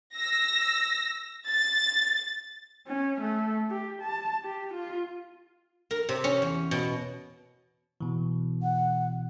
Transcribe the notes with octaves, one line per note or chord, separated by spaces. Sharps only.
E6 A#6
A6
C#4
A3
G4
A5
G4
F4
A#4
C3
C#4
E2
B2
B2 E3
F#5